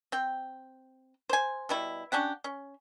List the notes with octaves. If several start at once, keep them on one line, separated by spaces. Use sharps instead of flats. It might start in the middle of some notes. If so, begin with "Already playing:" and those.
C4 G5
C5 G#5
B2 G3 E4
C#4 D4 G4 F#5
C#4